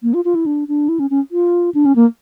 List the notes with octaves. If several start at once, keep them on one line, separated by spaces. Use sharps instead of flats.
A#3
F4
F4
E4
D4
D4
E4
C#4
C#4
F4
D4
C#4
A#3